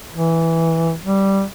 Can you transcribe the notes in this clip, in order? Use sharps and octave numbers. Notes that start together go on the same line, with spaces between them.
E3
G3